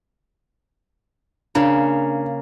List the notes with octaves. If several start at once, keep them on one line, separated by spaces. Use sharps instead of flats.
C#3 A#3 D4